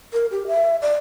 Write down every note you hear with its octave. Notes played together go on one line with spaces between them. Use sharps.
A#4
G4
E5
D5